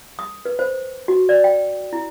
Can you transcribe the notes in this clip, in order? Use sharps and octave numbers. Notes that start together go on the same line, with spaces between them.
D#6
B4
C5
F#4
D5
G5
E4